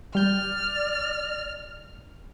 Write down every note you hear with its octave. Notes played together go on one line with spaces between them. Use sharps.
G3 D5 F6 G6